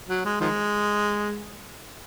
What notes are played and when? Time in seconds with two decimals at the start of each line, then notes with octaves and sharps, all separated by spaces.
0.08 F#3
0.25 G#3
0.41 D#3 F3 G#3